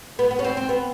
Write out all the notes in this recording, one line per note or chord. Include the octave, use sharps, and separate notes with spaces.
B3
B3
C#4
C4
C4
B3